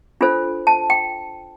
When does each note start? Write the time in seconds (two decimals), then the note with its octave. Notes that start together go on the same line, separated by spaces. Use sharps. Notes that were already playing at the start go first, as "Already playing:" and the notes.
0.21 D4 F4 A4 C5
0.67 A5
0.90 G5